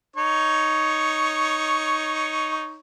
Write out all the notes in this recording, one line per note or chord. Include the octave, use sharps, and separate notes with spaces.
D#4 C#5 C#6